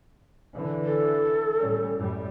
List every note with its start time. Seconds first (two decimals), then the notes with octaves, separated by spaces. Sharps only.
0.55 D3 E3
0.85 A4
1.60 A2 G3 C#4
1.98 F#2 A2 G3